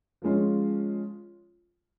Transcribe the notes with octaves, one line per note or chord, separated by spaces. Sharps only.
F3 G#3 C#4 F4